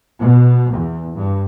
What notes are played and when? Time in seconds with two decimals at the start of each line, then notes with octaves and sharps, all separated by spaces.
0.20 B2
0.72 E2
1.15 G2